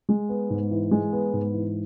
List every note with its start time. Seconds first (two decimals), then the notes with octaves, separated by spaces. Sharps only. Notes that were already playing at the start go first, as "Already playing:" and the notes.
0.09 G#3
0.29 B3
0.50 G#2
0.71 E3
0.91 G#3
1.12 B3
1.33 G#2
1.54 E3